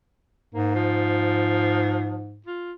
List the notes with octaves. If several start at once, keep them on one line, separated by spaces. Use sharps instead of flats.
G#2 A#3
F3
F4